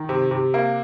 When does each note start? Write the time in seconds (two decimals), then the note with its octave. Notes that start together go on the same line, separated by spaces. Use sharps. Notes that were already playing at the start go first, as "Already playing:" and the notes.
Already playing: D#3
0.09 C3
0.31 C3
0.54 A#3